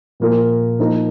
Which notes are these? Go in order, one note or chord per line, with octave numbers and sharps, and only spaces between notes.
A#2 F3 A#3 F4 A#4
F3 A#3 D#4 A#4